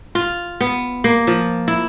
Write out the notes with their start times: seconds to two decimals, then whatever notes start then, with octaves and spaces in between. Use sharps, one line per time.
0.15 F4
0.61 B3
1.04 A#3
1.27 F3
1.68 E4